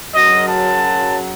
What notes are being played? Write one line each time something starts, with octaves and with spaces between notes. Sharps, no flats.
F#2 C#3 F#3 D#5
A5